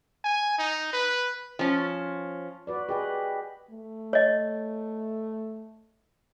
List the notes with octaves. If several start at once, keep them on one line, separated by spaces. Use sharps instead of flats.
G#5
D#4
B4
F3 C#4
F#4 B4 D5
G4 G#4 B4 D#5
A3
C#5 D#5